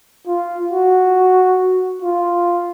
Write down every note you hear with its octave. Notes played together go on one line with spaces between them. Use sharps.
F4
F#4
F4